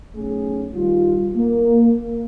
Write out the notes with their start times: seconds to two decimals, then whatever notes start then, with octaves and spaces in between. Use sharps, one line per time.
0.15 B1 A3 C#4 G#4
0.73 D#3 G3 F4
1.36 A#3